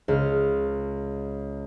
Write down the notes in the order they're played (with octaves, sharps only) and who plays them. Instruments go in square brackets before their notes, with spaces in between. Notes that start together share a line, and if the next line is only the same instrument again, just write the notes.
[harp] C#2 F6